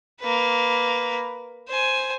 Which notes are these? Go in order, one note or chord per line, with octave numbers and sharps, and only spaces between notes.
A#3 B4
C5 G#5